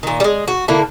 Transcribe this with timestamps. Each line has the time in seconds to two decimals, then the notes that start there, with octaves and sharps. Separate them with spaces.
0.03 A#2 D#3
0.20 G3 G#3
0.48 F#4
0.68 D3 A#3 E4 A4